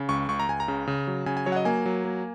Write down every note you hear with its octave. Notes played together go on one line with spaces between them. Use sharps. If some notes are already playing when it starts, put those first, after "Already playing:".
Already playing: C#3
C#2 C#6
C#2 C#6
A#5
C#2 G#5
A#5
C#3
C#3
F#3
C#3 G#5
G#5
F#3 C#5
F#5
D#5
A#3 G#5
F#3
A#3